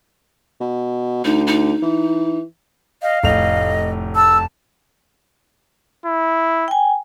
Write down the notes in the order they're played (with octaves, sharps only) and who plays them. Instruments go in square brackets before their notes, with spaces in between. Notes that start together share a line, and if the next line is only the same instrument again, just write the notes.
[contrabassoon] B2
[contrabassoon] D2 [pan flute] D#4
[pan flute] D#4
[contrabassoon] E3
[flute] D#5 [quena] F5
[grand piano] F1 A2 F7 [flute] D#5
[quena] A5 [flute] E6
[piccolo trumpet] E4
[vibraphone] G5 G#5